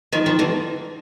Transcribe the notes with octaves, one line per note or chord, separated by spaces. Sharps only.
D#3 F3
D#3 F3
D3 E3